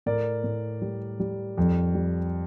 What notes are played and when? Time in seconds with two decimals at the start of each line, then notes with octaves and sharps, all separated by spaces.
0.06 A2 A#4 D5
0.44 A2
0.82 G3
1.20 G3
1.58 F2
1.94 G3